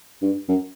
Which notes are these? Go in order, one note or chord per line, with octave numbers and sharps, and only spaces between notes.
G2
F#2